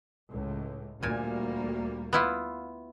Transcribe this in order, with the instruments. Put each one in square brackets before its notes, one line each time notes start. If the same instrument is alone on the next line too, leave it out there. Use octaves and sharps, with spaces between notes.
[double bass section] C#2 A2
[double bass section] D2 G3 A#3 [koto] A#2 G#5
[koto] B3 E4 F4